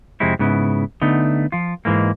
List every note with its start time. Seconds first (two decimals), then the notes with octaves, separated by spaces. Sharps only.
0.20 F2 C3 G#3 C4 E4
0.39 G#2 C#3 B3 E4
1.02 D3 A3 B3 D#4
1.52 F3 F4
1.85 G#2 E3 G#3 A#3